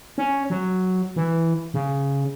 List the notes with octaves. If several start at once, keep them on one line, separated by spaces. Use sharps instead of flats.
C#4
F#3
E3
C#3